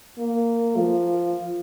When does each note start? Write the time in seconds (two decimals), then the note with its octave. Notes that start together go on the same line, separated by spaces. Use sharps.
0.18 A#3
0.77 F3